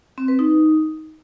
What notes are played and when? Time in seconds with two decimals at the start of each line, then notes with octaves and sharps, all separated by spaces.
0.18 C4
0.28 B4
0.39 D#4